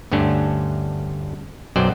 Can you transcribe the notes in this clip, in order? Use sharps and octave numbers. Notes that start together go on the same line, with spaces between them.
D2 G2 A3 C#4 D4
B1 F#2 F#3 C5 D5 G5